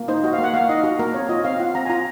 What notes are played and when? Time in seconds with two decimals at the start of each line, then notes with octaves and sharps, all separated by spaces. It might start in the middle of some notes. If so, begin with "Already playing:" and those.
Already playing: A#3
0.08 D#4 C5
0.24 F#4 D#5
0.33 F5
0.38 A#3
0.44 F#5
0.54 A#3 F5
0.69 D#4 D#5
0.84 F#4
0.99 A#3 A#4
1.14 C4 C#5
1.29 F4 D#5
1.44 C4 F5
1.60 F4 F#5
1.75 C4 A#5
1.86 G#5
1.90 F4 A#5